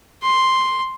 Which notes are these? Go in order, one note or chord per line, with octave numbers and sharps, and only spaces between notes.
C6